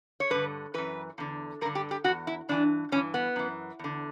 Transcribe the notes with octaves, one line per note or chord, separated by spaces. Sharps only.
C#5
G2 D3 B4
F#2 E3 B4
E2 D3
G2 D3 A#4
G4
G4
B2 F#4
E2
E4
G2 E3 D4
G2 E3 C#4
B3
F#2 E3
E2 D3